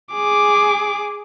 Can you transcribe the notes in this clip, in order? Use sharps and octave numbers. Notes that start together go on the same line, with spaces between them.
G#4 D6